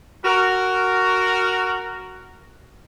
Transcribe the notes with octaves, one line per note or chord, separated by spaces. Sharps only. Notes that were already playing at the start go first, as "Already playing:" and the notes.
F#4 A#4